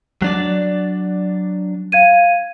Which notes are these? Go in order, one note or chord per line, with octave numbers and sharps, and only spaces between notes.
F#3 D4 D5
F5 G#6 D#7